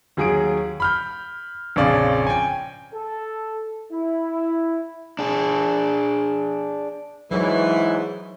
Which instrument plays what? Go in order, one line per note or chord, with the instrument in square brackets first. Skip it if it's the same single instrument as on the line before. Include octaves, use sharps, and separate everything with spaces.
[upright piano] D#2 F#3 G#4 D#6 D7
B5 F6 G6
A#1 F2 C#3 C#4 D5 F5
G5 G#5
[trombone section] A4
E4
[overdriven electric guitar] D4 G#4
[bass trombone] G#2 [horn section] E3 [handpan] F#3 C#5